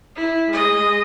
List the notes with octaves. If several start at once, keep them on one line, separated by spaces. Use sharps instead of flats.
E4
G#3 D#5